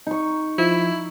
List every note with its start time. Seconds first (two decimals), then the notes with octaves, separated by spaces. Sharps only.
0.06 D#4 C#6
0.58 F3 E4